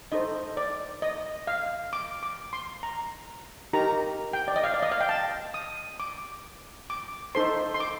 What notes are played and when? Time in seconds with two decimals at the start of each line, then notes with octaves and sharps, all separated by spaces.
0.12 D#4 A4 C5 D#5
0.57 D5
1.02 D#5
1.47 F5
1.93 D6
2.23 D6
2.53 C6
2.83 A#5
3.73 D#4 G4 A#4 A#5
4.33 G5
4.48 D5
4.56 D#5
4.64 F5
4.74 D5
4.83 D#5
4.92 F5
5.01 G5
5.09 A5
5.54 D#6
6.00 D6
6.90 D6
7.35 D#4 A4 C5 C6
7.74 C6
7.80 D6